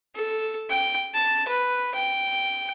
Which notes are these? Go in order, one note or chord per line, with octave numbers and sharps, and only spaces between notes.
A4
G5
A5
B4
G5